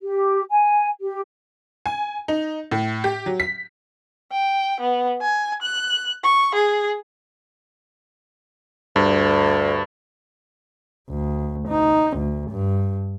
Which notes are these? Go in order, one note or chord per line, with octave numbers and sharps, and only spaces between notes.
G4
G#5
G4
G#5
D#4
A2
G4
F#3
B6
G5
B3
G#5
F#6
C#6
G#4
D2 G2
D2
D#4
D2
G2